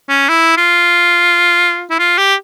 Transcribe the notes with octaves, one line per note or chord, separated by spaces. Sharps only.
C#4
E4
F4
E4
F4
G4